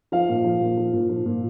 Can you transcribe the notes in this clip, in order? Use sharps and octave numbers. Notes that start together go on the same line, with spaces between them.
F3 F5
A#2
F3
A#2
F3
A#2
F3
A#2